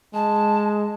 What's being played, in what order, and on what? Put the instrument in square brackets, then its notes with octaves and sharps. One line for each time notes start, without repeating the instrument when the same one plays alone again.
[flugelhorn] G#3 [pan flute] A5